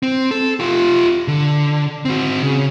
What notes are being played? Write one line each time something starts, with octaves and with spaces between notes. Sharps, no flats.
C4
A4
F4 G4
D3
C4 F#4
C#3